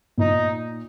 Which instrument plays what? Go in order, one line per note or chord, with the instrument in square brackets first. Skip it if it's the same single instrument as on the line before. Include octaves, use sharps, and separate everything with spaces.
[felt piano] A#2 [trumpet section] D#4